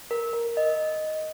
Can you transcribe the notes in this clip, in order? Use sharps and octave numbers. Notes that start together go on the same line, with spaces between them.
A#4
A#4
D#5